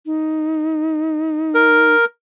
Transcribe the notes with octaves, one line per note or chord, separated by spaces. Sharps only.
D#4
A#4